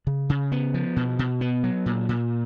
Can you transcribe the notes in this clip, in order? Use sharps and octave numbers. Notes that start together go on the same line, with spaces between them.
C#3
C#3
B3
F3
B2
B2
B3
F#3
A#2
A#2